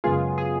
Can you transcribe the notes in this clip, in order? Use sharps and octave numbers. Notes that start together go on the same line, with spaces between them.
F#2 C#3 G#3 B3 F4 G#4
G#4